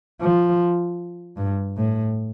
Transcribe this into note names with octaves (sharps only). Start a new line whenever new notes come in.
F3
G2
A2